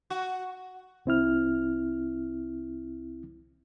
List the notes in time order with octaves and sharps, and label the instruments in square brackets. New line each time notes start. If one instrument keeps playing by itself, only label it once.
[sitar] F#4
[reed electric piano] C2 C4 E4 F6